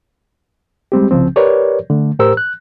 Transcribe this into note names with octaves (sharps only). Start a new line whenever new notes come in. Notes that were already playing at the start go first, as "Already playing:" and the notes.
G3 G#3 C4 G4
C2 C#3 F3 C4
G4 A#4 B4 C#5 D5
D3 A3
A2 G4 A#4 C5 A#5 E6
F#6